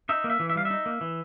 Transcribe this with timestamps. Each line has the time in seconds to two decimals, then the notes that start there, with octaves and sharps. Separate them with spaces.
0.09 D#4 E5
0.24 A#3
0.30 E5
0.40 E3
0.50 E5
0.56 G3 F5
0.65 E5
0.70 D#4
0.86 A#3
1.01 E3